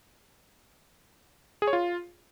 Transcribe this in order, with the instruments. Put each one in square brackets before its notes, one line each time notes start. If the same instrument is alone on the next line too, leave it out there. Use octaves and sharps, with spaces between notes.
[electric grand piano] G#4
C#5
F4